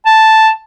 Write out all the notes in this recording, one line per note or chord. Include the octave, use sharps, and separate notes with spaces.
A5